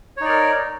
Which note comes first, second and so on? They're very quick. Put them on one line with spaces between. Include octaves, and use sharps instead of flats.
C#5 D#4 D5 A#4